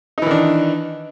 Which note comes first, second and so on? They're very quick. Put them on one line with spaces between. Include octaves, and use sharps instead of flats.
D#4 E3 D#3 D4